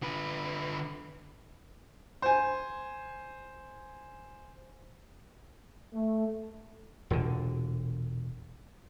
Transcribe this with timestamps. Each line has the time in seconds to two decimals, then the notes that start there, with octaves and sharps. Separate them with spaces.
0.02 D3 B4
2.22 C5 G#5
5.93 A3
7.10 E1 A#2 D3